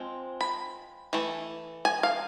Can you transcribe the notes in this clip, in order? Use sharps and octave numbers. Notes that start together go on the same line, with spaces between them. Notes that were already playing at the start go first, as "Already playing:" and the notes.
Already playing: F3 G#3 C4
B5
E3 A3
G#5
F5